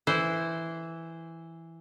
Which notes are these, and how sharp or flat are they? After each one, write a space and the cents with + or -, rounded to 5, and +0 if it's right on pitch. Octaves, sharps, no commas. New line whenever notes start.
E3 +0 E4 +0 C5 -10